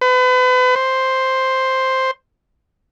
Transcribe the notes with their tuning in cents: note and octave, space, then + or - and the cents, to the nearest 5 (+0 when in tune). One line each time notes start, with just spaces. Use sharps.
B4 +35
C5 +5